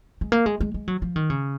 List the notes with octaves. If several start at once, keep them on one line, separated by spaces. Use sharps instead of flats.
G#3
A#3
G#3
G#3
G#3
F#3
F3
D#3
C#3